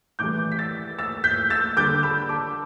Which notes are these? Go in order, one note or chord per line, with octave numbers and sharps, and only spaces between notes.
A2 E3 G3 D6 G6
B6
E6 A6
E6 A6
G6 B6
E6 A6
D3 G3 D6 G6
B5 E6
A5 D6